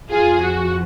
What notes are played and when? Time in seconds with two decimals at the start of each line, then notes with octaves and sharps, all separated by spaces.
0.10 F2 F3 F4 G#4
0.41 F#4